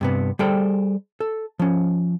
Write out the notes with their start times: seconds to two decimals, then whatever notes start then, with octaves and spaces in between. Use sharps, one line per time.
0.01 G2 C3 B3
0.39 G3 G#4 A4 C5 G5
1.20 A4
1.59 F3 C#4